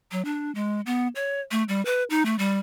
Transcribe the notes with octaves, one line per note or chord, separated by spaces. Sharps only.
F#3
D4
G#3
B3
C#5
A3
G3
B4
D#4
A3
G3